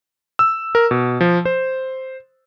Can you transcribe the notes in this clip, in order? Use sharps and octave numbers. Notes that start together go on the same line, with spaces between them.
E6
A#4
B2
F3
C5